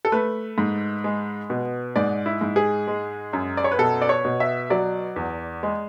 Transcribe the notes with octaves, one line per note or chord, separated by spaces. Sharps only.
A4
A3 B4
G#2
G#3
B2
G#2 D5
E4
G#2
G#4
G#3
F#2
D5
C#5
B4
B2 A4
D5
C#5
B2
E5
F#3 D5
E2
G#3